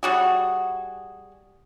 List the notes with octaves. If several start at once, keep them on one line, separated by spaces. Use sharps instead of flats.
G3 F#4 G#4